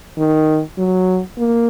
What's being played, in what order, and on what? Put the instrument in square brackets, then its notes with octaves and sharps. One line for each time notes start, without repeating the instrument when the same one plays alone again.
[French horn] D#3
F#3
A#3